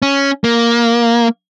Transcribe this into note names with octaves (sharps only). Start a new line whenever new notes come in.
C#4
A#3